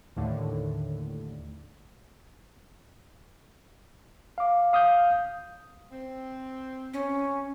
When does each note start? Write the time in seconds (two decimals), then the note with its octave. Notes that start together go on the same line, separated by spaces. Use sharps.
0.16 D#2 A2 D3
4.38 F5 D6
4.73 F5 D#6 F6 G6
5.91 C4
6.93 C#4